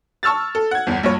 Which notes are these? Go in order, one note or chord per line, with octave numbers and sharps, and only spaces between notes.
A5 C#6 E6 F6 A6
A4
F#5 G#6
G1 E2
A#1 G2 C#5